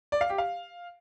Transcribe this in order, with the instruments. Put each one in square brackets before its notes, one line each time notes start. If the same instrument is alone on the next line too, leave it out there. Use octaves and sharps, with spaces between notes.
[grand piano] D5
F5
G4
F5